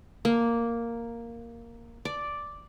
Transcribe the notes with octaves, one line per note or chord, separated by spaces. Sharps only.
A#3
D5